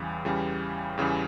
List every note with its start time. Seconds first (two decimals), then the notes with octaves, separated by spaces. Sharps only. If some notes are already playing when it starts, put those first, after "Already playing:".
Already playing: E2 C#3 E3 G3
0.25 E2 C#3 E3 G3
0.97 E2 C#3 E3 G3